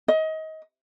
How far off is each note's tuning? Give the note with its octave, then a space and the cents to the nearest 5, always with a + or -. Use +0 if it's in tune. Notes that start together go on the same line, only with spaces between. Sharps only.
D#5 +25